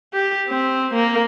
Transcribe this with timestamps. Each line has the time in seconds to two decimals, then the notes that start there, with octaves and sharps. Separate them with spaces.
0.14 G4
0.48 C4
0.94 A#3